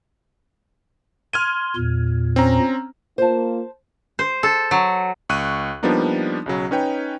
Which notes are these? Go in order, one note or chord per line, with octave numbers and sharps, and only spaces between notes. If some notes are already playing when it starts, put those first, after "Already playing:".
C6 F6 G#6 D#7
E2 A#2
C4 C#4 A#5
A#3 F4 C5 A5
C5
A4
F#3
C#2 C#6 F#6 D#7
F3 G3 A#3 B3 D4 D#4
B1 C#3 F#3
C#4 D#4 B4 C#5 G5